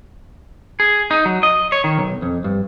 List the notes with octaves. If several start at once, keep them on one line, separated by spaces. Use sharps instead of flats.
G#4
D#4
F#3
D#5
C#5
D#3
B1
F2
G2